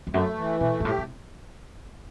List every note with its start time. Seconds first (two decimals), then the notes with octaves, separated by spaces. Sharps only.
0.07 E2
0.14 F#2 A3
0.38 E3
0.60 B2 A3
0.80 G2
0.85 A2 G4
0.98 C3